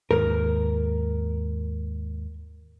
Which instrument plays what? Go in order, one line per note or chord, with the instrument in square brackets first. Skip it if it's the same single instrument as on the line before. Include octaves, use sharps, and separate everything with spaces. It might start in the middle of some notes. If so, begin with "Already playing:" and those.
[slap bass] D#2 G#2 [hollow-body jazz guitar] A#4